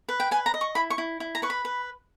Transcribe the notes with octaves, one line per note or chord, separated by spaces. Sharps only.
B4
G5
B4 G#5
A#5
D#5
C#6
E4 B5
C#6
E4
E4
A#5
B4 C#6
B5
B4